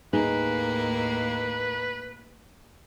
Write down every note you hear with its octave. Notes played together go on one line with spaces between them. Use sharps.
D#2 A2 A#3 D#4 G#4 B4